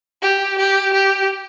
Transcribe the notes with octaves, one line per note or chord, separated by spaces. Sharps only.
G4
G4
G4